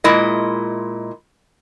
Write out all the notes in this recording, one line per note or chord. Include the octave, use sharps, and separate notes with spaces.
A#2 G#3 E4 D#5